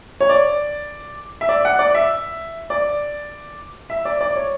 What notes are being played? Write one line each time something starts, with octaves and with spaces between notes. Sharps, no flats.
C#5
D5
E5
D5
F#5
D5
E5
D5
E5
D5
D5
C#5